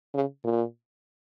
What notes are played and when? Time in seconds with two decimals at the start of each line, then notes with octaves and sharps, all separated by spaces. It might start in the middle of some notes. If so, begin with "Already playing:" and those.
0.14 C#3
0.44 A#2